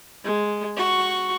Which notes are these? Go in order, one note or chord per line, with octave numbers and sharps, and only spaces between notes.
G#3
F#4 C#6